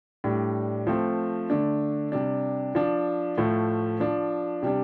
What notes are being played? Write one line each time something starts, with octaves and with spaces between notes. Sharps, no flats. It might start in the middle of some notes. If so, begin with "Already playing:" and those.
A2 G3 D4
F3 A3 C4
D3 A3 D4
C3 G3 D4
F3 D4
A2 F3 A3
F3 D4
C3 G3 D4